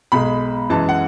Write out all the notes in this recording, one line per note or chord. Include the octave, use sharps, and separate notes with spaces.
B1 B2 G#3 B5
F#2 E3 G#3 A5
F#5